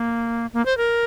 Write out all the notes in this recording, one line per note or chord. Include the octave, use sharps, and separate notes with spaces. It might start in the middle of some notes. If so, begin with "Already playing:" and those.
Already playing: A#3
A#3
C5
A#4